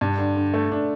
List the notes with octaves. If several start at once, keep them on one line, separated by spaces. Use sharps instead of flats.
G2 D4
D3
D3
A3
D4